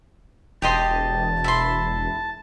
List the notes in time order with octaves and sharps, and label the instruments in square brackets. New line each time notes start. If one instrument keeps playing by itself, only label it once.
[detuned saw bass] E1 [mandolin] G4 D#5 C6 [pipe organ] A5
[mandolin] E4 C6